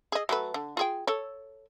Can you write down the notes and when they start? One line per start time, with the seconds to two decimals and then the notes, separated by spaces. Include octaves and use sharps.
0.12 G#4 D#5
0.29 F#3 A3 B4
0.54 D3
0.77 F4 G#4 G5
1.07 A4 C#5